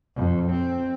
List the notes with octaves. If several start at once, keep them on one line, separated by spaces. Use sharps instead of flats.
F2
C4